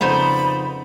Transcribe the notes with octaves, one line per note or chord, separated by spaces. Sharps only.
F2 C#3 B3 D#4 A4 C5 D5 B5